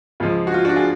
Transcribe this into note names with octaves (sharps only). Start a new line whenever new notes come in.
C#2 C#3 F3 F4
F#4
F4
D4 F#4
F4 G#4